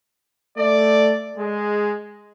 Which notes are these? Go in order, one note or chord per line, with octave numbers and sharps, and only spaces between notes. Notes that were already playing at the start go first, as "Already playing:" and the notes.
A3 D5
G#3